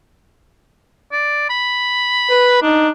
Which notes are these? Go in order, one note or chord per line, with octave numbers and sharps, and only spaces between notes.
D5
B5
B4
D4 D#4